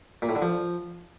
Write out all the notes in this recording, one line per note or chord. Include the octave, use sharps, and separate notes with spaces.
A#2
A2
D3
F3